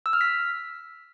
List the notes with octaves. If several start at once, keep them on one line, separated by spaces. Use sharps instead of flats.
E6
F6
B6